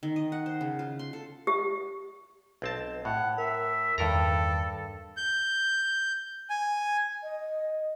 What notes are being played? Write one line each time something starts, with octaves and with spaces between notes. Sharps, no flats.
D#3
D#5
F#5
C5
C#3
F4
C6
A4
G4
B1 C4 A5
A2 F#5
A#4 E5
E2 G2 D#3 A4 A#4 A#5
G6
G#5
D#5